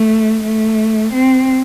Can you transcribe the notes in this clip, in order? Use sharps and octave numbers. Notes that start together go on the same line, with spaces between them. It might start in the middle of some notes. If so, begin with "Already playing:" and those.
Already playing: A3
A3
C4